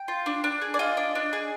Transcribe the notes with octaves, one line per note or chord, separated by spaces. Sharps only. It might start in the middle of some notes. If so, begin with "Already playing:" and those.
Already playing: G5
F4
D4
D4
G#4
D5
F4 D#5
D4
D4
G#4